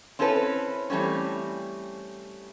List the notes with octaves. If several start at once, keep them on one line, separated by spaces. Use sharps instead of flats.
C4 C#4 E4 A4 B4
E3 G3 A3 C4 C#4